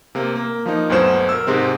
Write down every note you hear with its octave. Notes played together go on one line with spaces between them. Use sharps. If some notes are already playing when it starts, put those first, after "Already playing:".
C3 A#3
A#3
F3 A#3 D#4
G1 D2 B2 F#3 C5 E7
A#4 E6
G#2 C3 G#3 C4